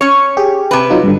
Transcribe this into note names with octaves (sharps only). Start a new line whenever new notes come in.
C#4 C#5 C#6
G4 G#4
C3 B4
F#3 D#4 F4
G2 D3